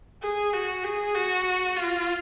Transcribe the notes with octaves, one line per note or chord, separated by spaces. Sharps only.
G#4
F#4
G#4
F#4
F4